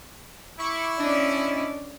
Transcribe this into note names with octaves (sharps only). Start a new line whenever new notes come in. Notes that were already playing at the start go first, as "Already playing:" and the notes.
E4 C#6 D6
C#4 D4 D5 D#5